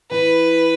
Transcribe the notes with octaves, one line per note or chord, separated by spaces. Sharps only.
E3 B4